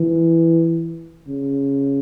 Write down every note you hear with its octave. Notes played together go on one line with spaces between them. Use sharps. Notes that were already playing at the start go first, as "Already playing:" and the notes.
Already playing: E3
C#3